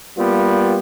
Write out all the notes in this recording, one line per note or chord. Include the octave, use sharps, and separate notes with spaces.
G3 A#3 B3 F4